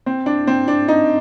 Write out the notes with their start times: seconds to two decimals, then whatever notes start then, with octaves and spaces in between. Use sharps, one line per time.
0.06 C4
0.26 D4
0.47 C4
0.68 D4
0.88 D#4